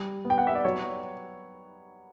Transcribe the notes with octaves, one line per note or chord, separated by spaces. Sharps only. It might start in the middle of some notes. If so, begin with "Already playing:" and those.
Already playing: G3
B3
G5
F#5
E5
D5
F#3 C#5